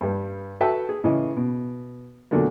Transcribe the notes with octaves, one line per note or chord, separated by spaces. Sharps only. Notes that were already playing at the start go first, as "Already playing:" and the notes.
G2 G3
F#4 A4 B4 E5 G5 A5
G#4
A2 C#3 E3 D#5
B2
E2 A#2 D3 F#3 A3 A#3